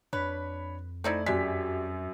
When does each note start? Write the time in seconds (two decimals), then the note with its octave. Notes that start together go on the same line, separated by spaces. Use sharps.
0.13 F2 D4 B4 C#5 B5
1.04 A3 C4 D#4 E4 D5 G#6
1.26 F#2 G#3 G4 D5 B6